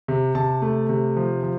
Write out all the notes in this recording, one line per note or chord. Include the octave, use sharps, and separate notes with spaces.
C3
C3 A5
A3
C3
F3
F3